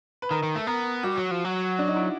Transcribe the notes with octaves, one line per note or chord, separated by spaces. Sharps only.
B4
D#3 A#4
D#3
A3
B3 A#4
G3 F#4
F#3
F3
F#3
D4
D#4
E4